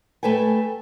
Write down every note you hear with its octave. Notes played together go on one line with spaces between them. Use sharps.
A3 A4 B4 G5 G#5